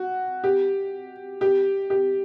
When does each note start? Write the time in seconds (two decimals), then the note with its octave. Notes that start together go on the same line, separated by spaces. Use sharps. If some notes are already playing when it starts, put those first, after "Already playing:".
Already playing: F#4
0.44 G4
1.41 G4
1.90 G4